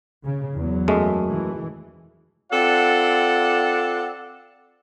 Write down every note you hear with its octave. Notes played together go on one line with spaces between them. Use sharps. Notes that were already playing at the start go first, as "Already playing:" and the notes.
C#3
E2 F#3
F#2 G#3 A3
E3
C4 F4 A4 D5 F#5